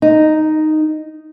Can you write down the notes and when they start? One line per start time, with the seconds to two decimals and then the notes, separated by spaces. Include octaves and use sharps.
0.02 D#4